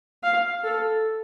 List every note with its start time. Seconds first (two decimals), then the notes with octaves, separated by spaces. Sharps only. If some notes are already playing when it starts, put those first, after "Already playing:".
0.23 F5
0.64 A4